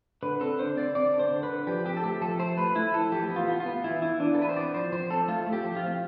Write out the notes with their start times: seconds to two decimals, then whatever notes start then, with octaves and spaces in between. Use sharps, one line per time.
0.23 D3 B4
0.41 C4 A4
0.59 D3 C5
0.77 C4 D5
0.95 C4 D5
1.13 D3
1.19 C5
1.31 D3
1.43 B4
1.49 D3
1.67 F3 G4
1.85 C4 G4
1.97 A4
2.03 A3 G4
2.21 F3 A4
2.39 A3 C5
2.58 A3 B4
2.76 A3 E4
2.93 F3 A4
3.12 E3 G4
3.30 B3
3.36 F4
3.48 B3
3.60 F4
3.66 B3
3.84 E3 E4
4.02 E3 E4
4.20 E3 D4
4.35 A4
4.38 B3 B4
4.49 C5
4.56 C4 D5
4.74 F3 C5
4.92 F3 C5
5.10 C4 A4
5.28 A3 F4
5.46 A3
5.53 G4
5.64 F3
5.76 F4
5.83 C4